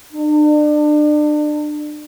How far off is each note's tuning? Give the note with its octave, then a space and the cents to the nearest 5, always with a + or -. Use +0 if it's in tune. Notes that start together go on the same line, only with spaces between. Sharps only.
D4 +35